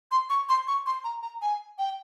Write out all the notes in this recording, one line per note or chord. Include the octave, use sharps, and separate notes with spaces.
C6
C#6
C6
C#6
C6
A#5
A#5
G#5
G5